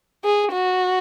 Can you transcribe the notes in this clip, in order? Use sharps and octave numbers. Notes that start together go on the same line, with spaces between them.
G#4
F#4